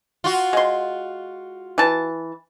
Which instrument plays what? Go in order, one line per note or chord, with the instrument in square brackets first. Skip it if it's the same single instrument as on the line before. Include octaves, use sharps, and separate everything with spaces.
[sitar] F4 F#4
[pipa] G#3 C6
E3 A5